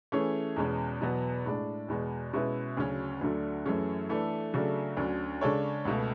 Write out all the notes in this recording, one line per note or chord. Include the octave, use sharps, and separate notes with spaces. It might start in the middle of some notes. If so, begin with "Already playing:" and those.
E3 A3 C#4 G#4 C#5
E2 B2 G#3 C#4
E2 B2 F#3 B3
A2 G#3 D4
E2 B2 G#3
B2 G#3 C#4 E4 B4
D2 C#3 F#3 C#4
D2 D3 F#3 A3 D4
F#2 E3 A3 C#4 G#4
E3 A3 D4 A4
C#3 F#3 A3 D4 A4
D2 D3 F#3 C#4
C#3 G#3 D4 A4 C#5
C#2 B2 A3